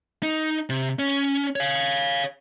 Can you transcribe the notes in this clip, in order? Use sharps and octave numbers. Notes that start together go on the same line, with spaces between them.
D#4
C3
C#4
C#5 F5